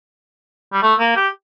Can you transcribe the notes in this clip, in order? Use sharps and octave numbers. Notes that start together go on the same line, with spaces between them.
G3
A3
A#3
G4